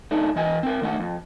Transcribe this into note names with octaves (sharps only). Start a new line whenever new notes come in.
A3 D4 D#4
E3 D#5 G#5
C4 A#4
D#3 A3 F#5
F2